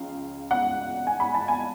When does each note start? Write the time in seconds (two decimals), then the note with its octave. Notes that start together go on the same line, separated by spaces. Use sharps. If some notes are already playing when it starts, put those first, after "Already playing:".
Already playing: C#2 C#3 F3 F5
0.51 F#5
1.07 G#5
1.20 B5
1.34 A5
1.48 G#5